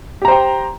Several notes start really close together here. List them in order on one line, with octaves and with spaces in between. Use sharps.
G4 A#5 C5 G5